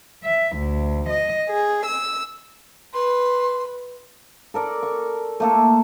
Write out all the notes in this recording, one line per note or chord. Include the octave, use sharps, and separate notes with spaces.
E5
D2
D#5
G#4
E6
B4 C6
A4 A#4 D5
C#6
A3 A#3 A4